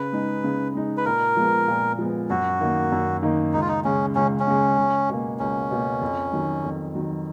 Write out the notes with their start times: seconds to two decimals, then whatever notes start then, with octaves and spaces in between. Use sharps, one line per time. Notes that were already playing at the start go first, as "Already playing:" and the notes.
Already playing: C#3 B4
0.13 G#3 D#4
0.44 C#3
0.74 G#3 D#4
0.97 B4
1.05 A#2 A#4
1.36 F3 G#3 B3
1.68 A#2
1.99 F3 G#3 B3
2.30 F#2 F#4
2.61 D#3 A#3 D#4
2.92 F#2
3.23 D#3 A#3 D#4
3.53 C#2 D#4
3.61 F4
3.68 D#4
3.84 C#3 G#3 C#4
4.15 C#2 C#4
4.40 C#4
4.47 C#3 G#3
4.77 C#2
5.09 B2 A#3
5.40 C#2 C#4
5.71 B2 A#3
6.01 F2
6.33 D#3 F#3
6.64 F2
6.95 D#3 F#3